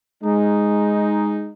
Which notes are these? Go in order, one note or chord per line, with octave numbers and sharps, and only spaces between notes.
G#3 D#4